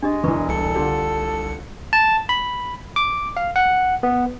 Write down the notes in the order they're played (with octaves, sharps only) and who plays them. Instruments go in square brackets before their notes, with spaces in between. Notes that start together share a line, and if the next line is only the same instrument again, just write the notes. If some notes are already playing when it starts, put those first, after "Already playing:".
[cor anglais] G#3 [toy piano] D4 G4 D#5
[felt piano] E1 E3 [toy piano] B4 C#6
[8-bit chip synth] C2 C#7 [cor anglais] A4
[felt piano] D3 F4 G4
[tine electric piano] A5
B5
D6
F5
F#5
B3